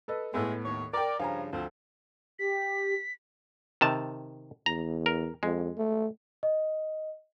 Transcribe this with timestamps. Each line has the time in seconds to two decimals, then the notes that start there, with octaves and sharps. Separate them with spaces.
0.08 A4 B4 D#5
0.34 A2 G#3 A3 B3
0.65 D#2 C#5
0.93 A#4 D5 G5
1.19 G2 C#3 F3 F5 G#5 A#5
1.53 D2 F3 C4
2.39 G4 B6
3.81 C3 D#3 A5
4.66 E2 A#5
5.06 A#4
5.43 F2 G#3
5.78 A3
6.43 D#5